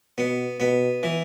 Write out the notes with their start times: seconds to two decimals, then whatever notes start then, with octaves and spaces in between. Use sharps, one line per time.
0.18 B2 B3
0.60 B2 B3
1.03 E3